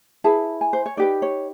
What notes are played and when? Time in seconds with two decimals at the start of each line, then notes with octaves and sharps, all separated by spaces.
0.24 E4 G#4 B4 A5
0.61 G#5
0.73 C5
0.86 C#5
0.97 D#4 G4 B4 D5
1.22 C#5